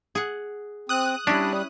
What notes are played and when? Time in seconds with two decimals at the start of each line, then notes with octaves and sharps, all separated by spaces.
0.15 G#4 F#5
0.89 C4 D#6 F#6
1.27 G3 C#4 D4 E4